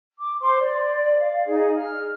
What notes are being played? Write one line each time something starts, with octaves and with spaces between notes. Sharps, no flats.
D6
C5 C6 D6
D5
F5
D#4 G#4
F6